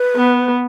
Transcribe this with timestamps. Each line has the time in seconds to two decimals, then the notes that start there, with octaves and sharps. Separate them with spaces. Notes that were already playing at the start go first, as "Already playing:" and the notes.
Already playing: B4
0.16 B3